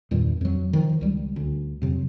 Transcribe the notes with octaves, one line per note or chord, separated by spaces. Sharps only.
E2 G2 A#2 D#3
F2 F#3
D#3 F3
C#2 G3
D2
F2 C3 F#3